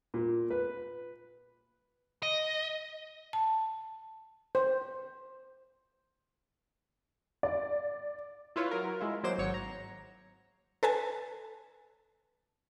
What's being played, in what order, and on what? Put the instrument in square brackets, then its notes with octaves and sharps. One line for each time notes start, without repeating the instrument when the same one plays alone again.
[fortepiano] A#2
B4
[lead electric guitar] D#5
[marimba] A5
[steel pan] C5
[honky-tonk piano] D5
[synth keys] E4 F4 B4 C#5
F#3 A#4
G#3 E4 F4
F#3 G#3 A#3 C5 D6 E7
G#1 F#3 C#5 C#6
A#5
[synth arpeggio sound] A4 B4 G#5 A5